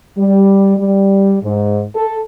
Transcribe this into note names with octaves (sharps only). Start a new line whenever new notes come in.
G3
G3
G#2
A4